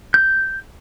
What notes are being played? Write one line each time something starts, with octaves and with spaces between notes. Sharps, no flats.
G6